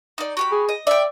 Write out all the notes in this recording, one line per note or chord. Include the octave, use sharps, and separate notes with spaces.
D#4 D5
F#4 G4 B5
G#4
D#5
D5 E5 G5